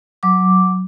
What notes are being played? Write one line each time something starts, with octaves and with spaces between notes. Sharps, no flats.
F#3 D6